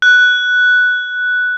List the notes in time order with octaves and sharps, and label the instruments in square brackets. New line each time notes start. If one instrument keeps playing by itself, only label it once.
[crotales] F#6